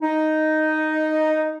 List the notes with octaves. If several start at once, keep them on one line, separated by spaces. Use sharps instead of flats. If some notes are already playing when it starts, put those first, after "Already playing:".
D#4